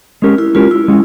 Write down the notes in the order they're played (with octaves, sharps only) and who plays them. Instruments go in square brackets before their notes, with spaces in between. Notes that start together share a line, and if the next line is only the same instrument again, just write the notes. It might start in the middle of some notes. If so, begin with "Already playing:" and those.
[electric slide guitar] G#3 C#4 G4 A#4
[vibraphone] E4
[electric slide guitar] G#3 C#4 G4 A#4 [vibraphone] F4
[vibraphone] E4
[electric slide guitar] G#3 C#4